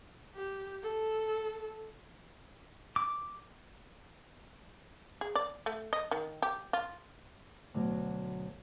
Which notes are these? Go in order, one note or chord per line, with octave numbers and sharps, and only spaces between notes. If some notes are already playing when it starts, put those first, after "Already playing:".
G4
A4
D6
G#4
D5
A3
D#5
D#3
G4
F4
D2 B2 F#3